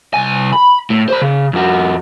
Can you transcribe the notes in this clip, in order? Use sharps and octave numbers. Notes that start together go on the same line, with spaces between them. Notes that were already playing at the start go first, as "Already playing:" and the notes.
C2 G#5
B5
A2
C5 B5
C#3
F2 F#4